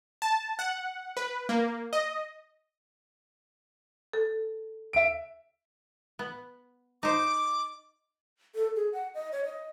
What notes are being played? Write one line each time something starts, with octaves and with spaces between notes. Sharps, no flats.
A5
F#5
B4
A#3
D#5
A4
E5 D7
B3
D#4 C5 D6
A4
G#4
F#5
D#5
C#5
D#5